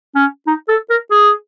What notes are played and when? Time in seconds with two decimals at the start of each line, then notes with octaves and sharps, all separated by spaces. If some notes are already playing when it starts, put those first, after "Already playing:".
0.15 C#4
0.47 D#4
0.69 A4
0.90 A#4
1.11 G#4